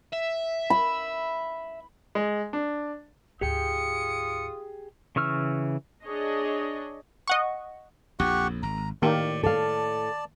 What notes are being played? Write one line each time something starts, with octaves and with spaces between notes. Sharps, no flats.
E5
B5
G#3
D4
D2 G#2 F4 G4 G#4 G5 D#6 C#7
C#3 E3 C#6 E6 F6
D4 G#4 C#5 D#5
D#5 F#5 C#6
A#1 F2 G4 F#5 C#6
G#1 A#5
A2 D#3 A#3 G4 D5
A4 D5 F5 A5